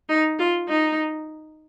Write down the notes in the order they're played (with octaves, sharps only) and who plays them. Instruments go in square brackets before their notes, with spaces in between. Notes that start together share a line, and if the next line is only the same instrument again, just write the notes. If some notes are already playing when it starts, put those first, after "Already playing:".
[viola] D#4
F4
D#4